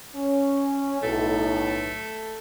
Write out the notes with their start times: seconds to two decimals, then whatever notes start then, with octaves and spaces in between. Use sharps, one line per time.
0.16 C#4
1.02 B1 A2 A3